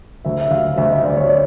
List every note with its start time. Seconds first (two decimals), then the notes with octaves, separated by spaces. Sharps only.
0.25 D2 E5
0.41 E5
0.51 D2 F5
0.78 D2 E5
0.90 D#5
1.04 D2 D5
1.17 C#5
1.28 D5